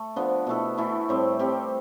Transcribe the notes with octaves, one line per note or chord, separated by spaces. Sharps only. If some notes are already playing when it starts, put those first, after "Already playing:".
Already playing: A3
D3 F3 B3
B2 A3 E4 A4
E3 A3 E4
A2 G3 C4
G3 C4 G4